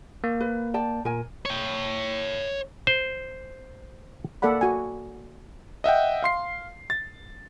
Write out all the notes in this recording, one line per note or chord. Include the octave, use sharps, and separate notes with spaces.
A#3
B4
D5 G5 A5
A#2 A#4 G#5
C#5 G5
C5
A#3 A4 D5 F#5 B5
F#4 G#5
D#5 E5 F#5 G5
F5 C6 C7
A6